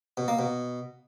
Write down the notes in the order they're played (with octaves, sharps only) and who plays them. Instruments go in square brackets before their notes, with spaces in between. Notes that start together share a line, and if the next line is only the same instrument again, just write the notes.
[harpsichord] B2
A#3
B2